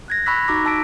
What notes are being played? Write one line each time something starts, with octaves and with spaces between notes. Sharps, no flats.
F#6 G#6 A#6
B5 C#6 E6 F#6 B6
D#4 F#4 A#5 D6 A#6
D#4 F#4 A5 E6 B6 D7